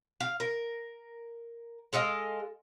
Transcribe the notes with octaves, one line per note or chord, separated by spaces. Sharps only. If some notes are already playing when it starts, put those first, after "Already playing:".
F5
A#4
G#3 A4 D#5 F5